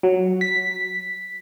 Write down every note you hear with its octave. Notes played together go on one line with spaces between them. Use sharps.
F#3
B6